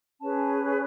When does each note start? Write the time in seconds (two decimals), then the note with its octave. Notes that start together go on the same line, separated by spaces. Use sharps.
0.21 C#4 G#4 B4 A5